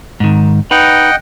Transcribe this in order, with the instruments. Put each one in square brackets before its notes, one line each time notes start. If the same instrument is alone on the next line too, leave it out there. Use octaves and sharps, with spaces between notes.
[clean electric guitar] G#2 D#3
[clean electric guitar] D#4 B4 [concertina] D#5 F#5 G5